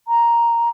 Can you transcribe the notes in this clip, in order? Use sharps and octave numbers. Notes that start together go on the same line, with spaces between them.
A#5